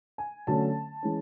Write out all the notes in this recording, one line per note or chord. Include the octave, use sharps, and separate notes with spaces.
G#5
D3 F#3 A3 C#4 A5
E3 G#3 C#4